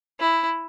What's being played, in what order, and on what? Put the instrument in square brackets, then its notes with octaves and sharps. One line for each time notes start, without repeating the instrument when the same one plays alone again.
[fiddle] E4